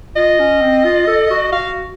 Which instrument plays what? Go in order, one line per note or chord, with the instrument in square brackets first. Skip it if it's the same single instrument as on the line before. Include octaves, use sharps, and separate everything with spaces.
[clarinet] F4 [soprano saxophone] D#5
[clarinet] C#4
C4
F4
A4
F#4
[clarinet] F#4 [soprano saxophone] F5